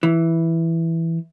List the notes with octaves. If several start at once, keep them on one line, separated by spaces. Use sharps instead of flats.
E3